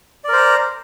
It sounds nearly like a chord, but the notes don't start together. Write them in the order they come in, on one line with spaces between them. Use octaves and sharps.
D5 A#4 C5 A#5